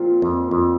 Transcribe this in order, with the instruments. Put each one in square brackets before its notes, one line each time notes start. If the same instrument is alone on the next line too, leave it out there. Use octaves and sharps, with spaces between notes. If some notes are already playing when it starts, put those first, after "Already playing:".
Already playing: [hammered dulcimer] A#2 F3 C4 F4
[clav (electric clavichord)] F2
F2